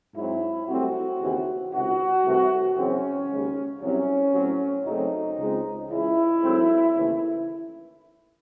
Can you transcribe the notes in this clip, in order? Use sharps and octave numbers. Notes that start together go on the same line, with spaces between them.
G#2 F#3 C4 E4
C2 C3 F#3 A3 C4 F#4
D#2 C#3 E3 C4
C#2 C3 D#3 F#4
C2 C3 E3 A3 C4
F#2 C#3 E3 C4 C#4
D#2 C#3 G#3
C2 C3 F#3 C#4
A2 F#3 C4
F#2 C#3 F#3 A3 C4 D#4
C#2 C#3 G#3 C4
C#2 C#3 E3 E4
G#2 F#3 A3 C4
D#2 C#3 E3 A3